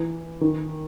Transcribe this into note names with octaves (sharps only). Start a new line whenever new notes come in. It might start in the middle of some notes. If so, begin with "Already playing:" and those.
Already playing: E3
D#3